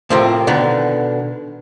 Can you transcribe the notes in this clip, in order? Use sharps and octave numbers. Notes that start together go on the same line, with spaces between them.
A2 C3 F3 A#3 C4
B2 D3 D#3 B3